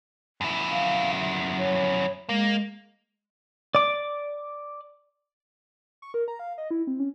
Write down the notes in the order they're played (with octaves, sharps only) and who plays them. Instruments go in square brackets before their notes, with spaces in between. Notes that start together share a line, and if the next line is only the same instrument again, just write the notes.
[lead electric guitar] F#2 E4
[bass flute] F5
E5
C#5
[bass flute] G#3 [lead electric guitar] A#3
[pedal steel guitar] D5 D6
[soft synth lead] C#6
A#4
A#5
F5
D#5
E4
C4
C#4